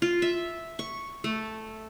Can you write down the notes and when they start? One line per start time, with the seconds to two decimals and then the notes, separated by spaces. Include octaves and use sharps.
0.02 F4
0.22 E5
0.79 C#6
1.24 A3